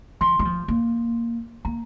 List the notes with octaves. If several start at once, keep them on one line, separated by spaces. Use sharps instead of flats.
F3 C6
G3
F3
A#3
A#3 A#5